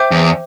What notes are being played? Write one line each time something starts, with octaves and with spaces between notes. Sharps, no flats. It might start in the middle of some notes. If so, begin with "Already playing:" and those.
Already playing: C5 E5 G5 D6 G6
E2